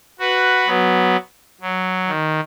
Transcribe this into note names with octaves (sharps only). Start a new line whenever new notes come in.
F#4 B4
F#3 B3
F#3
D#3